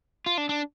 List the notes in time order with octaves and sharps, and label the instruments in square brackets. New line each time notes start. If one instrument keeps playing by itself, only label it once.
[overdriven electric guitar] F4
D4
D4